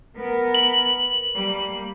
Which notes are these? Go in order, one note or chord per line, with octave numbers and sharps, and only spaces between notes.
B3 A#4
F#7
G3 A#3